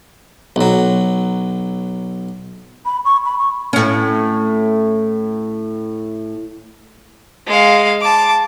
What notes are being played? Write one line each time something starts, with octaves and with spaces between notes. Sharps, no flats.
B1 F#3
B5
C#6
B5
C#6
A2 C#4
G#3 F5
A5 D6